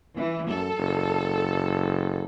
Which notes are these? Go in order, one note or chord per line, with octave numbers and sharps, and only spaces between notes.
E3
F#2 A4
F#1